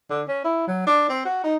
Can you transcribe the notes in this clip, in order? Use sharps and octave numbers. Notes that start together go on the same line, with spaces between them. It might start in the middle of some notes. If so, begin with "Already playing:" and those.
D3
C#4
E4
F#3
D4
C4
F#4
D#4